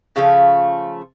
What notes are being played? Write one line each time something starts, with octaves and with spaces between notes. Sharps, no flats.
C#3 F3 A3 F5